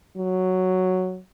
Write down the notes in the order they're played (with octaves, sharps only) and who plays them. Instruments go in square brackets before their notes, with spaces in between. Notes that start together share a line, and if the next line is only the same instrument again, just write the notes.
[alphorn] F#3